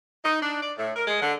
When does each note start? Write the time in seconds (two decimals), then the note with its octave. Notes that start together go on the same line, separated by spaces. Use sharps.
0.24 D#4
0.41 D4
0.62 D5
0.78 A2
0.96 A#4
1.08 G#3
1.21 D3